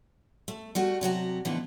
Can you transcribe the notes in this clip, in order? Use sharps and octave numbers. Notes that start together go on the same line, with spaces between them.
A3
G3 A3 F#4
C3 F#3 F#4 G4
D#2 A2 D3 E3 F3 B3